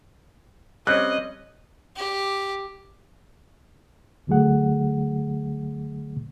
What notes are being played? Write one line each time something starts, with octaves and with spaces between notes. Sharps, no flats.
G3 C4 C#4 D#5 F#6
G4
C#2 D3 F#3 A3 G#4 F#5